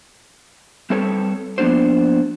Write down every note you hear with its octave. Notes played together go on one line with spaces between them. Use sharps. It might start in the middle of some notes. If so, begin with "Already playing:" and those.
G3 C4 A4 B4 C#5
F3 A#3 B3 D4 F#4 C5